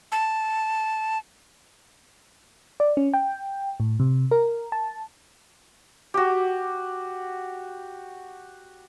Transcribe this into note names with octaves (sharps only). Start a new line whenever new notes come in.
A5
D5
C#4
G5
A2
C3
A#4
A5
F#4 G4